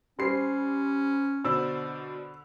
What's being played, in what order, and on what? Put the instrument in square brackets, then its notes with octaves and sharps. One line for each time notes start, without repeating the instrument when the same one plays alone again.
[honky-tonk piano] G3 C7 [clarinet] C#4 [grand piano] C5 B5 C6
[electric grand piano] B2 C5 D5 [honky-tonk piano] D3 [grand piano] B5 E6